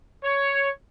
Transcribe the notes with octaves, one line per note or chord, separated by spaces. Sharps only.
C#5